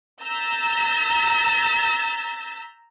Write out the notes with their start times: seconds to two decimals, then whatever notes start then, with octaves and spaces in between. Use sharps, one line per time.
0.24 A#5 E6 G6 A6 B6